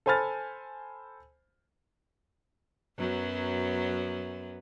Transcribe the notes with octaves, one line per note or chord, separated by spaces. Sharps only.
A4 C5 G#5 B5 F6 A6
F#2 F#3 B3